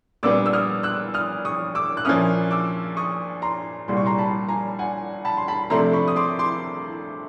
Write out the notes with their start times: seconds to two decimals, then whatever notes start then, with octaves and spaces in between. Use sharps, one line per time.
0.23 A#2 G3 B3 D4 D6 E6
0.46 E6
0.53 D#6 F6
0.83 E6 F#6
1.14 D#6 F6
1.45 C#6 D#6
1.75 D6 E6
1.97 F#6
2.05 A#2 F3 A#3 C#4 E4 D#6 F6
2.51 D6 E6
2.97 C#6 D#6
3.42 A#5 C6
3.88 C2 A#2 G3 C6
3.97 C#6
4.06 A#5 C6
4.18 A5 B5
4.49 G#5 A#5
4.79 F#5 G#5
5.25 A5 B5
5.37 C6
5.48 A5 B5
5.63 B5
5.70 C3 F3 A3 D4 A#5 C6
5.93 B5 C#6
6.08 D#6
6.16 C6 D6
6.39 C6 D6